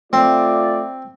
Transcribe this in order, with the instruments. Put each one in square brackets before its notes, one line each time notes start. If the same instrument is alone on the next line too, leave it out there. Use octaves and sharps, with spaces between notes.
[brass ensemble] A3 F4 D5 [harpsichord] C4